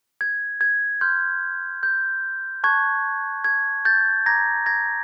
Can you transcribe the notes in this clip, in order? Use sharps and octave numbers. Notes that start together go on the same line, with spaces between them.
G#6
G#6
C6 F6 G6
G6
A5 C#6 F#6 G#6
G#6
G6 A6
A#5 D6 G6 G#6 A#6
G#6 A#6